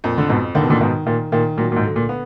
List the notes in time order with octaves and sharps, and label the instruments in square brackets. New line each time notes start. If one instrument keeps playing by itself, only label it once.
[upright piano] F2 [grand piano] A#2
[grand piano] D3
[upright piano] F2 [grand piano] G#2 B2
[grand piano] D3 [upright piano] D#3
[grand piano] B2
A#2 D3
[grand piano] G#2 B2 [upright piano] D#3
[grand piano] A#2 [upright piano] D#3
[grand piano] A#2 [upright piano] D#3
[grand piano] A#2 [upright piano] F#3
[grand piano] A#2
G#2
[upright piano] D3
[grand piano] A#2
[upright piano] B3